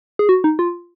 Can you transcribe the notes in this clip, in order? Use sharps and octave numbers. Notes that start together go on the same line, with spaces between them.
G#4
F#4
D#4
F4